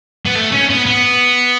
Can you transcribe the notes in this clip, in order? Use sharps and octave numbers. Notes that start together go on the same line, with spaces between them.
B3
A3
C#4
B3
B3